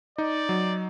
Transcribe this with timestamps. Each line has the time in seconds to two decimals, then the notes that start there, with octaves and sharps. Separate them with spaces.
0.18 D#4 D5
0.49 F#3